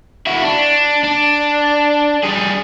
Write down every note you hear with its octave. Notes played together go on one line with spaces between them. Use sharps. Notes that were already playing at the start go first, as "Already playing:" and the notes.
E4 F#4
D4
D4
G3 G#4